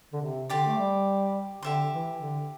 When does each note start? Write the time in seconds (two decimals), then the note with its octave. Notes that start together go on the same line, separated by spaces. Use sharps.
0.13 D3
0.21 C3
0.50 D3 G4 D5 C6
0.67 A3
0.78 G3
1.62 D3 G4 E5 C6
1.91 E3
2.19 D3